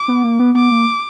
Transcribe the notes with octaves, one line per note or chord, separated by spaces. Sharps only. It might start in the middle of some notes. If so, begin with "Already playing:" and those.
Already playing: D6
B3
A#3
B3
B3 D6
A#3